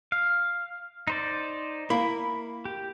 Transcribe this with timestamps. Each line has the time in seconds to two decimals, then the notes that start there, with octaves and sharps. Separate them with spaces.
0.12 F5
1.07 D#4 C5 D5
1.90 A#3 E4 B5
2.65 G4